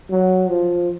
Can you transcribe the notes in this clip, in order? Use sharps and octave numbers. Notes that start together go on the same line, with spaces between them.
F#3
F3